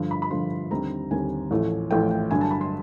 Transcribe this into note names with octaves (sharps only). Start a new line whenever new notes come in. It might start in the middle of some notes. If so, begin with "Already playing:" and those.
Already playing: G2 D3 F3
B5
B5
G2 D3 F3 C6
D#2 D3 G3 C4 A#5
D#2 D3 G3 C4 G#5
A1 A2 F3 A3
A1 A2 F3 A3 G5
G5
G2 D3 F#3 G#5
A5
B5
C6